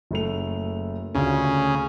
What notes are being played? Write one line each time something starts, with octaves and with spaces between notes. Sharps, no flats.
F#1 A3 F7
D2 C#3 F4